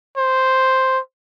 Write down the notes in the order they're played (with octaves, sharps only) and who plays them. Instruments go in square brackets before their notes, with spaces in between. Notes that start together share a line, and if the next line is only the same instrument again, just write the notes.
[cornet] C5